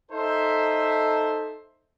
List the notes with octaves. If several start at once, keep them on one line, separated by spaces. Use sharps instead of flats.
D#4 A4 C5 E5